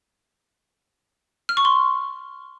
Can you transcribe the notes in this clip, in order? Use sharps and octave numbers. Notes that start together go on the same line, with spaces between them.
F6
C#6
C6